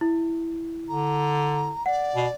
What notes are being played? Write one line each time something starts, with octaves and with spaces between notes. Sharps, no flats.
E4
D3 A#5
D5 F#5
B2